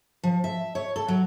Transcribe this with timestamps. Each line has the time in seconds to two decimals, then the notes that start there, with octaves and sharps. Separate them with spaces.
0.23 F3
0.44 E5
0.75 C#5
0.96 A4
1.08 F#3